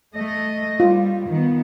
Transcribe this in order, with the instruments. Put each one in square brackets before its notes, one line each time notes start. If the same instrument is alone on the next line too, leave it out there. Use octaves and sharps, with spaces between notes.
[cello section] A3 D#5
[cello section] G3 [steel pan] F4
[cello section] D#3 B3